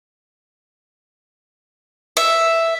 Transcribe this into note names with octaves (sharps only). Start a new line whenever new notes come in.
E5